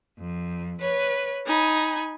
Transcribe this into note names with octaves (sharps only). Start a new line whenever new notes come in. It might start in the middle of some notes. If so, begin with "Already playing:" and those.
F2
B4 C#5
D#4 G#5 B5